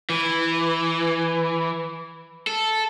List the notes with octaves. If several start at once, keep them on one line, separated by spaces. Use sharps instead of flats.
E3
A4